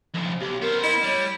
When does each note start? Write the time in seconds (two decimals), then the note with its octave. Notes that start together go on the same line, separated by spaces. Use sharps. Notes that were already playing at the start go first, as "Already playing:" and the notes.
0.14 F2 C#3
0.40 B1 G4
0.62 B3 A#4 C5
0.83 E4 D#5
1.03 G3 C#5